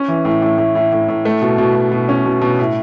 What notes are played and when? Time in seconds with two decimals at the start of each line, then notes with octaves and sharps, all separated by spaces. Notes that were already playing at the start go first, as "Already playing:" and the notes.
Already playing: C#4
0.08 E3
0.25 A2
0.42 A2
0.58 A2
0.75 A2
0.92 A2
1.09 A2
1.25 A3
1.42 B2
1.58 B2
1.75 B2
1.92 B2
2.09 C#4
2.26 B2
2.42 B2
2.59 A2